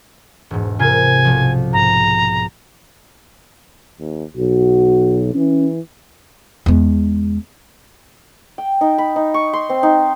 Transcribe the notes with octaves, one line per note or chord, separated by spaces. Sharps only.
E1 G#2
C3 F4 A#4 G#5
B1 F3
G#2 A#5
D#2
B1 F#4
E3 C#4
E2 G#3
G5
D#4
B5
D#4
C#6
C6
C4
D#4